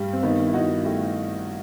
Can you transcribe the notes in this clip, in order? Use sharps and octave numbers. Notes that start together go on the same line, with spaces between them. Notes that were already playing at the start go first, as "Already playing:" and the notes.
Already playing: G2 G3
C4
D#3 B3 D#4
E4
G2 D#4 F#4
A3 E4 G4